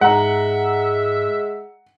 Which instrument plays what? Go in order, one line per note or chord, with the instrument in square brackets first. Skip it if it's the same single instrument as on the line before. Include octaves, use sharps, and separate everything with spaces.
[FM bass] G#2 [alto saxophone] G#3 [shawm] E5 [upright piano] F#5 A#5